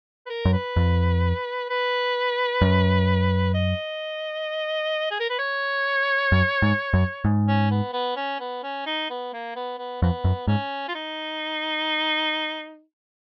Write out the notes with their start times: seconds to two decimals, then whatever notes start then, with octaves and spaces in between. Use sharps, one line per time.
0.26 B4
0.30 A#4
0.45 F#2
0.53 B4
0.76 F2
1.70 B4
2.61 F#2
3.54 D#5
5.11 G#4
5.20 A#4
5.29 B4
5.39 C#5
6.32 F#2
6.62 G#2
6.93 F#2
7.25 G#2
7.47 C#4
7.71 B3
7.93 B3
8.16 C#4
8.40 B3
8.63 C#4
8.86 D#4
9.10 B3
9.33 A#3
9.56 B3
9.78 B3
10.02 F2 B3
10.24 F#2
10.47 G#2 C#4
10.88 F4
10.95 D#4